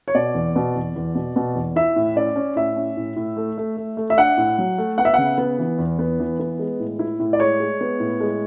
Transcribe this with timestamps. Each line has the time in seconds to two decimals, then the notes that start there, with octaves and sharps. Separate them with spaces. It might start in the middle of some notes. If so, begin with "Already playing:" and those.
0.08 C#5
0.15 B2 D5
0.35 E2
0.56 B2
0.76 E2
0.96 E2
1.15 B2
1.36 B2
1.55 E2
1.76 E4 E5
1.96 A2
2.16 C#4 D5
2.36 C#4
2.56 A2 E5
2.76 C#4
2.97 A2
3.16 A2
3.37 A3
3.58 A3
3.77 A3
3.97 A3
4.10 E5
4.17 D4 F#5
4.38 A2
4.58 F#3
4.78 A3
4.98 B3 F#5
5.05 E5
5.14 C#3 F#5
5.38 B3
5.59 E3
5.79 E2
5.99 B3
6.19 E3
6.39 B3
6.59 G#3
6.80 A2
6.99 E4
7.20 A2
7.33 D5
7.40 G#3 C#5
7.60 G#3
7.81 B3
8.00 A2
8.21 G#3